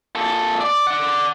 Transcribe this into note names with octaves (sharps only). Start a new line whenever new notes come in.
A#2 A4
D5
D5 F#5